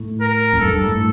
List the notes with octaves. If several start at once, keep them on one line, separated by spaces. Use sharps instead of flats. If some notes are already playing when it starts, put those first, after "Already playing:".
Already playing: A2
A#4
F2
G2 A4
G2
A2